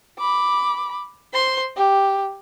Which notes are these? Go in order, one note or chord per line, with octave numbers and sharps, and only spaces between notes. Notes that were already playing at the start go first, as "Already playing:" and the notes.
B5 D6
C5 C6
G4